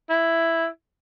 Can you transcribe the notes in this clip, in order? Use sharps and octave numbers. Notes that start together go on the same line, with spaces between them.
E4